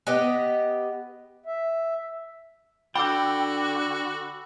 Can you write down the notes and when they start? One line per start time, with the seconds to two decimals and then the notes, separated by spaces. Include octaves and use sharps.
0.07 B3 G4 D#5
1.46 E5
2.96 D3 F#4 G5 B5 D6 E6